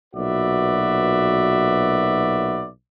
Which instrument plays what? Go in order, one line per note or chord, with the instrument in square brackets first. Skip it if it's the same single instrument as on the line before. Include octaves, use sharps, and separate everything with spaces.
[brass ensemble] B1 A#2 F#4 B4 D5 E5